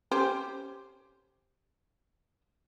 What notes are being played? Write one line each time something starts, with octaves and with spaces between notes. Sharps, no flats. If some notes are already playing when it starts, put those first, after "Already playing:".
C#4 G4 C5